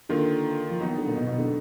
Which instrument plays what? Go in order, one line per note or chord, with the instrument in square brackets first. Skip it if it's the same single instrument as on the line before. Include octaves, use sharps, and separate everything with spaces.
[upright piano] D3 [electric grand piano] D#3 A#3 F4 A#4
[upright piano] F3
[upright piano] D#3 [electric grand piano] F#3 B3 D#4
[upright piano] D3
A#2
B2
B2
D3